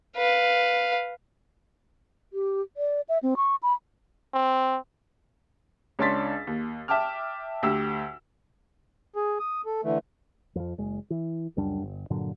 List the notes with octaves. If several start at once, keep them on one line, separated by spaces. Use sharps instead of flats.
B4 F5
G4
D5
E5
C4
C#6
B5
C4
C#2 C#4 D4 C6 A6 B6
D#2
E5 G5 A5 D6 F6
D2 G4 E6
G#4
D#6
A4
D3 E3 A3
F2 F3
F#1 G#3
E3
C#2 F#2 G3 D4
G1
G2 A#2 D3 F#3